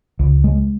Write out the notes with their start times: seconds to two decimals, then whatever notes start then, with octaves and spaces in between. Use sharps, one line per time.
0.19 C#2
0.44 G#3